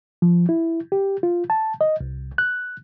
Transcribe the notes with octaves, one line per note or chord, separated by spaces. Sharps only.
F3
E4
G4
F4
A5
D#5
C2
F#6